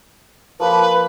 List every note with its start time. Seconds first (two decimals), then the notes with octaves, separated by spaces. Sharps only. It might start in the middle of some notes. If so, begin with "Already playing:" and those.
0.60 F3 A#3 B4 B5